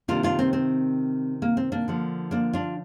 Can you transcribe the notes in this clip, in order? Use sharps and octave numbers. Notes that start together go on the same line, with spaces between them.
C3 D#3 A#3 D4 F4
D4 F4
C4
C4
A#3
C4
A#3 D4
D3 F3 A#3
A#3 D4
D4 F4